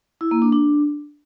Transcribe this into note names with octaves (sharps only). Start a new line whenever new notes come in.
E4
A#3
D4
D4